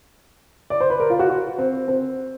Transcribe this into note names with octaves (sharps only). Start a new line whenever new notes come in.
D5
C5
B4
A#4
F4
F#4
F#4
C4
C4